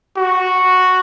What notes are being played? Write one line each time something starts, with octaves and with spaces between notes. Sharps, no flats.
F#4